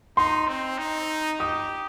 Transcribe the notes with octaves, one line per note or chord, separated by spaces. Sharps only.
D#4 C6
C4
D#4
G4 D#6